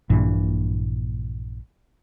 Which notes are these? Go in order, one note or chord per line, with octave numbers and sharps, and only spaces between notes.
A#1 G2 A#2 E3